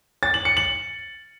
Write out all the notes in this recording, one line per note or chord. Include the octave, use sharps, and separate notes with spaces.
A6
F#7
C#7
F#7